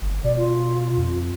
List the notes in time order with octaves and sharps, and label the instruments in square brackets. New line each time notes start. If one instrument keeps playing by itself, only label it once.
[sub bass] G1
[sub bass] B2 [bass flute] D5
[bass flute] F4
[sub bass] F2